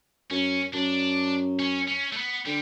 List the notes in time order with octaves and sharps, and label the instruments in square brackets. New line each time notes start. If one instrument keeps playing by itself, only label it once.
[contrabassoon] F#2 [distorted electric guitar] C#4
[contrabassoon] F#2 [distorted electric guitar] D4
[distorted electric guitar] C#4
C#4
A3
B3
[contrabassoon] D3 [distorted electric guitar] G3